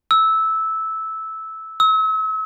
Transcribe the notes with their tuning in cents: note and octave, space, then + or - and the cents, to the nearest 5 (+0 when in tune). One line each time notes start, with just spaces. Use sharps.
E6 -10
E6 -40